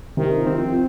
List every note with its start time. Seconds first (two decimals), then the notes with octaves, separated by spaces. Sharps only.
0.17 C3 D#3
0.38 F4
0.47 C4
0.57 F3